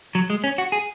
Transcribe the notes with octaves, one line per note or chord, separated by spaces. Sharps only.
F#3
G#3
C#4
F#4
G#4